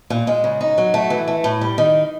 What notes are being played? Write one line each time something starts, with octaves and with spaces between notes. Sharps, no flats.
A#2
G#3
C#3
D#4
F#3
A3
E3
A3
A2
G3
D#3